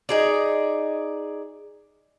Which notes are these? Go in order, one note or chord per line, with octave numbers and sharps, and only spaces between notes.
D#4 G#4 D5